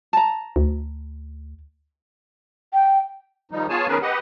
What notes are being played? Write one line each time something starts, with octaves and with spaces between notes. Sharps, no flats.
A5 A#5
D2
G5
D#3 F3 G3 D#4
B3 F4 G#4 C#5 G#5 A5
D#3 B3 C#4 G#4 A#4 B4
G4 B4 D#5 F#5